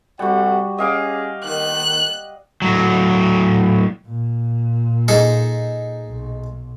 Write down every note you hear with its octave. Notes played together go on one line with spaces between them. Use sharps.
C3 G3 F#4 A4 F#5
C#4 G#4 D#5 F5 D6
D#3 F#6
A2 F#3
A#2
D#4 G#4 A4
B1